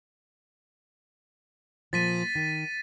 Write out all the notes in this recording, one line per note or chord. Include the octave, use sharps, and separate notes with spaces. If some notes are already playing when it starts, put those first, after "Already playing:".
A#2 F3 A6 B6 D#7
D#3